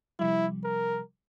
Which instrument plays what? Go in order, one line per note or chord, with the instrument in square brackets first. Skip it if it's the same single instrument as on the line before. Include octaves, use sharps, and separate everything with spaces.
[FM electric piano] C3 F3 G3 [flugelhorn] E4
[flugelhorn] A#4